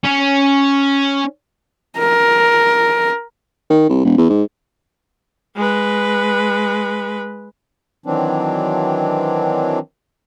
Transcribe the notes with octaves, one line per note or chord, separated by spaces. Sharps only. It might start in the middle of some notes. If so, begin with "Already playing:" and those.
C#4
A#4
D#3
C2
E1
E2
G#2
G#3 B4
D#3 E3 F#3 C4 D4